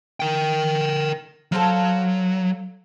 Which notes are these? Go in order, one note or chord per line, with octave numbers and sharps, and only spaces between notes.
A#4 G5
F#3 A4 C5 F5